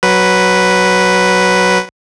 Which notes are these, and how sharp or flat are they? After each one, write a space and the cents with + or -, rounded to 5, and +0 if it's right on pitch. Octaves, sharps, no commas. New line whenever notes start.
F#3 +10 B4 +0